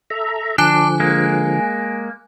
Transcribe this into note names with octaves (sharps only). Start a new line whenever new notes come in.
A4 E5 A#5
D3 F3 D4 G#5 F#6
G#3 A#3